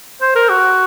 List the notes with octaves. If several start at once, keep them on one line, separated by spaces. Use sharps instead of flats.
C5
A#4
F#4